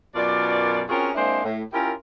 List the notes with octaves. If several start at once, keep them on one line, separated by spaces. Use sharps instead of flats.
F#2 B2 F4 A#4 D5
C4 C#4 F4 F#4 G#4 A#4
G#3 A#3 C4 D4 E4 C5
A2
C#4 E4 F4 G4 A#4